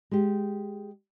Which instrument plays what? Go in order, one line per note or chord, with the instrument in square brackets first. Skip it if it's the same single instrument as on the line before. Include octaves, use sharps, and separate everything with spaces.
[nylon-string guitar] G#3 G4